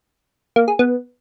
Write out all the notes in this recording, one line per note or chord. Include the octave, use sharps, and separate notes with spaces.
A#3
G#4
B3